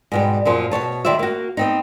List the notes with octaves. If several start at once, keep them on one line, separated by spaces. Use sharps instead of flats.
G#2 B2 G3
F#2 A#2 F3
B2 D#3 C#5 A5
D2 D#3 E4 C5 D5 E5
A#3 F#4
B3 C4 D#4